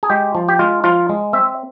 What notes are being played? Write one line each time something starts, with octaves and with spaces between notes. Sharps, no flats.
G#4
G#3 G4
F3
G4
G#3 F4
F3 F4
G#3
C4 E5